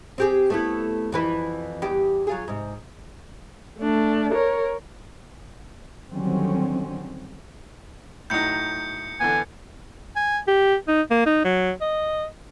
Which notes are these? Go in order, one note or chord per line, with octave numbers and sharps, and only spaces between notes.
C4 G4 G#4
A3 B3 E4
F2 E3 B4
E2 G4
F#3 F4 G#4
G#2 C3
A3 D4
A#4 C#5
D3 D#3 F#3 G3 C4 C#4
A2 F#3 D#4 G6 C#7
D3 E3 B3 G#5
G#5
G4
D#4
A#3
D#4
F#3
D#5